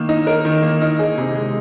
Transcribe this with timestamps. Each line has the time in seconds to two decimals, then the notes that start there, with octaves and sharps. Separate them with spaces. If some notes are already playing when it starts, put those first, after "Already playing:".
Already playing: D#3 A#3
0.09 D#4
0.27 A#4
0.45 D#3
0.62 A#3
0.82 D#4
0.99 G#4
1.18 C3
1.36 G#3